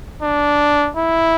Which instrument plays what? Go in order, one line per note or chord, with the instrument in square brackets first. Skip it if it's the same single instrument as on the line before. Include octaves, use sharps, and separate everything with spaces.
[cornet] D4
E4